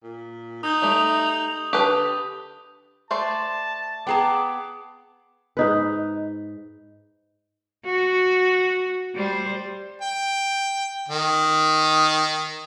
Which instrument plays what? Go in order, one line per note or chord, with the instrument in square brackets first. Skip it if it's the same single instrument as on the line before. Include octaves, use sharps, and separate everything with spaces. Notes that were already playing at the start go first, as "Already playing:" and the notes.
[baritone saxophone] A#2
[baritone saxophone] D#4 [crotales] D#6 G6 G7
[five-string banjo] G3 A3 [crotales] D#6 G6 F7
[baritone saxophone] D3 [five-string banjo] G4 A4 B4
[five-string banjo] A3 C5 D5 [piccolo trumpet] A5
[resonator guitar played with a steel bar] B3 G#4 A5 [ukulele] G5 A#5 [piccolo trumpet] D6
[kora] G#2 D#4 B4
[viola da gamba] F#4
G3 C5
[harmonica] G5
D#3